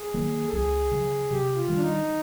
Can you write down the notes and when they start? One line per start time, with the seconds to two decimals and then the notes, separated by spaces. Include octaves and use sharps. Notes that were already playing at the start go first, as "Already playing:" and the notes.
Already playing: G#4
0.14 D#3 F#3 A#3
0.47 A4
0.53 C#2 G#4
0.91 C#3 F#3
1.30 C3 G4
1.55 F4
1.68 D#3 G3
1.76 D4
1.81 D#4